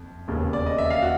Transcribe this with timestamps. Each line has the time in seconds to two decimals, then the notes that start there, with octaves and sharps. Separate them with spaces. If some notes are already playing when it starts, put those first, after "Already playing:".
Already playing: F#1 F2
0.28 E1 D#2 C#3
0.53 D5
0.66 D#5
0.78 E5
0.90 F5
1.02 F#4